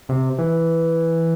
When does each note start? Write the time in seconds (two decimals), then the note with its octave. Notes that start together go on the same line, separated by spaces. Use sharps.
0.09 C3
0.38 E3